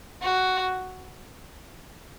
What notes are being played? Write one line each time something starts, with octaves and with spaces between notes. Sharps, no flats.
F#4